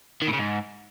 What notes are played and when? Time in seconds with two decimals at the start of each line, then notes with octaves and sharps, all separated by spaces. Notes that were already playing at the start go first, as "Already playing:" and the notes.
0.22 D#3
0.27 A2
0.33 C#3
0.39 G#2